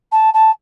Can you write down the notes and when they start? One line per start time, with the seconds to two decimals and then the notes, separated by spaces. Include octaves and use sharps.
0.12 A5
0.34 A5